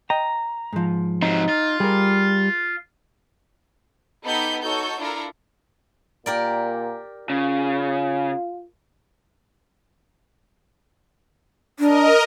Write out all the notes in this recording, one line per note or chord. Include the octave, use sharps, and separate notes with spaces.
D#5 G5 A#5
G#2 F3
C3 F#3 D#4
F4
G3 G#4 A#4
B3 D#4 G4 A4 B5 G6
D#4 F#4 A4 C#5 G6
D4 E4 F4 A4 A#4 A#5
A#2 G4 A#4 D5
C#3 F4
D4 A#4 D#5